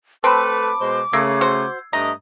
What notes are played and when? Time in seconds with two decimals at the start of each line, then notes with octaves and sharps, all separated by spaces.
0.24 A3 C4 A4 B4 A5 B5 D6
0.81 B2 G#3 C5
1.13 C#3 A3 A#3 E6 G#6 C7
1.41 F#4 C5
1.93 G2 A3 D#5 A#5